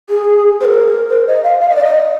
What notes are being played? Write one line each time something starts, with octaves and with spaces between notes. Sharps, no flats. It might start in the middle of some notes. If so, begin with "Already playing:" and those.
G#4
C5
A#4
C5
D#5
F5
F5
D#5
D5
D#5